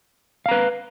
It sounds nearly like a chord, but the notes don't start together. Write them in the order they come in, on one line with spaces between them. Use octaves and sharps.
F5 A#5 B4